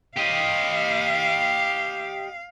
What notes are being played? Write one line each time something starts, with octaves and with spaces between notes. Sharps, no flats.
G4 D#5 F5